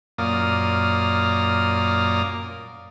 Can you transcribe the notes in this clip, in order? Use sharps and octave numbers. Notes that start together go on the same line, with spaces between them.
F#2 A#2 A#3 D5 D#6 F6